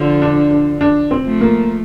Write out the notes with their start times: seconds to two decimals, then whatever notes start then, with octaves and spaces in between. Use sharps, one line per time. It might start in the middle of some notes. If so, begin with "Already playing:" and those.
Already playing: D3 F3
0.22 D4
0.51 D4
0.81 D4
1.11 C4
1.25 F3 A3
1.41 A#3